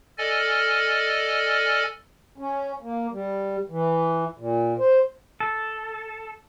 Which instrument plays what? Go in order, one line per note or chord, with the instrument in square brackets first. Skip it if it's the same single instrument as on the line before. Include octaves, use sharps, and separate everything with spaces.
[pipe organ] A4 D5 D#5 G#5 F6
[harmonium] C#4
A#3
G3
E3
A#2
C5
[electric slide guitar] A4